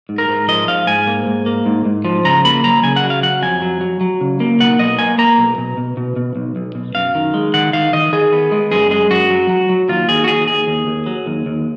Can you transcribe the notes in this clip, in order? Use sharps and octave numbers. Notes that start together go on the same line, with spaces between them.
G#2
A#4
G#2
F3 D#5
G#2 F5
G#2 G#5
A#3
G#2
A#3
G#2
G#2
F3
C#3 A#5
A#3 B5
F#3 A#5
C#3 G#5
F#5
F#3
F5
F#3 F#5
F2 G#5
F#3
F#3
F#3
C#3
A#3
B1 F#5
B1 D#5
A#3 G#5
A#3 A#5
B1
B2
B2
B2
B2
B1
B1
B2
F#2 F5
D#3
G#3
D#3 F#5
D#3 F5
D#3 D#5
D#3 G#4
B3
G#3
F#2 G#4
G#3 G#4
F#2 F#4
F#3
F#3
F#3
D#2 F4
D#2 G#4
F#4
D#2 G#4
D#2 G#4
D#2
D#2
F#3
D#2
D#2